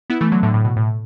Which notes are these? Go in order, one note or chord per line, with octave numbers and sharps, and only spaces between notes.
B3 E4
E3 A3
D3 F#3
A2 D3
A2
B2
A2